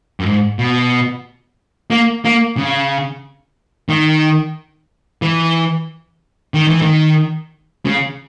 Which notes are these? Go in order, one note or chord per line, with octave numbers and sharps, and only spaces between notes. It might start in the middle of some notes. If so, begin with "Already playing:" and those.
F#2
G#2
B2
A#3
A#3
C#3
D#3
E3
D#3
E3
D#3
C#3